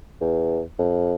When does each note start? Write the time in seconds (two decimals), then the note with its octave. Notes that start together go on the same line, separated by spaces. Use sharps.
0.21 E2
0.79 F2